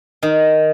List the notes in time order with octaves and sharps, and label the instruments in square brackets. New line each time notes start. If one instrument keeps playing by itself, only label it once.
[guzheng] D#3